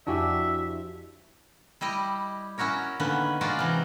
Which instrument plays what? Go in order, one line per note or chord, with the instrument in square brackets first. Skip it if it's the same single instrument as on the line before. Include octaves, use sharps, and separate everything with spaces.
[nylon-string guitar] F2 E4 G#5 [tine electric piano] D4 F#4 G4 [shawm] E5
[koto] G3 E4 G4 D#5
C#4 E4 F#4 A#4 C#5
D3 D#3 A#3 B3 C#4 B4
G#3 C#4 F4 F#4 A#4 D5
C3 E3 A#5